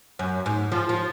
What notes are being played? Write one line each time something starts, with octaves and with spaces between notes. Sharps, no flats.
F#2
G#2
F3
F3